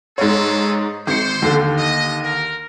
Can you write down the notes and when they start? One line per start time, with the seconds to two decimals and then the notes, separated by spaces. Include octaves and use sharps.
0.18 G#2 B3 G#4 A4 C#5
1.07 G#1 C5 C#7
1.42 D#2 D3
1.78 D#5
2.23 A#4